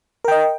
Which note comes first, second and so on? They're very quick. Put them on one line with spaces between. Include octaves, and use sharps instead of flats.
A#4 G5 D#5